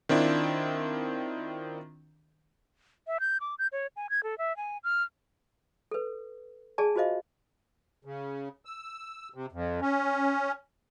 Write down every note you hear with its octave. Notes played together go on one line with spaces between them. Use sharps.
D#3 C4 D4 E4 F4
E5
G6
D6
G6
C#5
G#5
G#6
A4
E5
G#5
F6
A4 B4
G#4 D5 G#5 A5
F4 F#4 C5 D#5 F5
C#3
E6
C3
F2
C#4